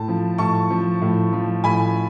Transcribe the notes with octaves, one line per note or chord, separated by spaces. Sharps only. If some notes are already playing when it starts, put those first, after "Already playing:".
Already playing: A2 A5
F3
A2 A5 C#6
F3
A2
F3
A2 G#5 B5